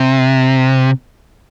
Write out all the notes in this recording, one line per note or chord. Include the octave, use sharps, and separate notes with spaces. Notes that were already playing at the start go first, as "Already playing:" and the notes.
Already playing: C3